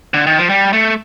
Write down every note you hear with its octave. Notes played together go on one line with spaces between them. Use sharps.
D3
D#3
F3
G3
A3